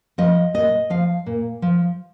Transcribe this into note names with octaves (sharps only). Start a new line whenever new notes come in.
F3 D#5
A#2 D#5
F3 F5
A#2
F3